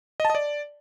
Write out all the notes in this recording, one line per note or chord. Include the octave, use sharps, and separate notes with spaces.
D#5
A5
D#5
D5